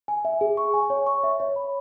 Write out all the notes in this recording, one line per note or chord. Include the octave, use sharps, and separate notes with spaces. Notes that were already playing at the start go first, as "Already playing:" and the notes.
G#5
E5
G#4
C#6
G#5
C#5
C#6
E5
C#5
B5